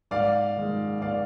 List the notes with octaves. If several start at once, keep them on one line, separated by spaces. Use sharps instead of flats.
G#2 D5 F5
D#3 G#3
D5 F5